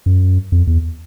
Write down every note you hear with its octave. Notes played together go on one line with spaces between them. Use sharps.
F#2
F2
E2